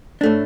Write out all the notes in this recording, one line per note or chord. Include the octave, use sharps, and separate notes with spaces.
A2 A3 D4